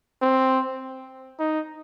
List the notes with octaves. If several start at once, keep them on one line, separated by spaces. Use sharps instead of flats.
C4
D#4